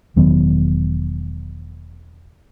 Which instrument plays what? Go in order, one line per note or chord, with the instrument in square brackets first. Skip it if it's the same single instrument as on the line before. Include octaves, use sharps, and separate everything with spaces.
[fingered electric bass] E1 D#3 F#3 B3